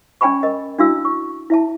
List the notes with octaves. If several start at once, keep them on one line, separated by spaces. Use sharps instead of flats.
C#4 D5 G5 G#5 B5 C#6
A#4 D#5
D4 E4 F#4 F5 E6
C#6
E4 E5 A5